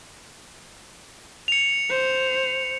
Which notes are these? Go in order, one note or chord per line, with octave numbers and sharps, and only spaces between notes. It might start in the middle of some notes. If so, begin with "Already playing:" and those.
C#7 F7
C5